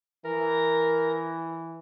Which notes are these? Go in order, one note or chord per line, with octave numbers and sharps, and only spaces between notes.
E3 A#4